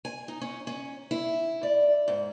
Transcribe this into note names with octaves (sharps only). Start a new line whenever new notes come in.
G#5
D#4
C#4
C#4
E4
D5
G#2